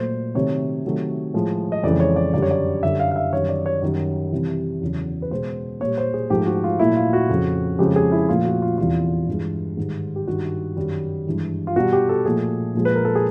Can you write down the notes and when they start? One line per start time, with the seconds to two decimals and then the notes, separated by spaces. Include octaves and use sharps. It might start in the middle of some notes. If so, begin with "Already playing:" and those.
Already playing: A#2 F#3 A3 C5
0.35 C3 D#3 F#3 A3 C#5
0.85 C3 D#3 F#3 A3
1.34 A2 F3 G#3
1.72 D#5
1.83 F2 C#3 E3 G#3 D5
2.00 C#5
2.16 D5
2.34 F#2 D3 G3 D5
2.42 C#5
2.51 D5
2.83 F#2 D3 G3 E5
3.00 F5
3.11 F5
3.16 E5
3.32 F#2 D#3 G3 C#5
3.49 D5
3.66 C#5
3.82 F#2 D#3 G3
4.32 C3 E3 G3
4.81 E2 C#3 F#3
5.22 B4
5.30 B2 G#3 C5
5.80 A#2 G3 C#5
5.98 C5
6.14 G#4
6.30 G#2 F3 A3 G4
6.46 F#4
6.64 F4
6.79 A#2 F#3 A3 E4
6.96 F4
7.13 F#4
7.29 F2 C#3 F3
7.79 F2 C#3 F3 G#3 G4
7.96 G#4
8.12 E4
8.29 A#2 F3 A3 F4
8.45 F#4
8.62 F4
8.78 E2 C3 E3 G3 F4
9.28 G2 E3 G#3
9.77 G#2 D#3 G3
10.16 G4
10.27 G2 D#3 G3 F#4
10.76 F#2 D#3 G3
11.27 G2 E3 G#3
11.67 F4
11.76 B2 G3 F#4
11.93 G4
12.09 A4
12.25 A#2 F3 A3 G#4
12.74 A#2 F3 G#3
12.85 B4
12.95 A#4
13.05 A4
13.15 G#4